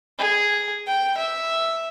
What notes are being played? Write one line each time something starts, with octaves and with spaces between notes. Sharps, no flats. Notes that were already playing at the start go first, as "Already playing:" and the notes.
G#4
G5
E5